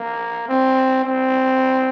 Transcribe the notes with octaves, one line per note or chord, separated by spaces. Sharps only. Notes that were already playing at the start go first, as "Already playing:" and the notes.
Already playing: A#3
C4
C4